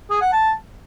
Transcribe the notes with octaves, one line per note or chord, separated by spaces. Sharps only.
G#4
F#5
A5